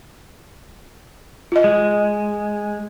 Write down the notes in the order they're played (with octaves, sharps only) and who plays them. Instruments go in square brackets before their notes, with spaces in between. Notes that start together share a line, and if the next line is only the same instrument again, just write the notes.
[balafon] F4 D#5
[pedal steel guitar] G#3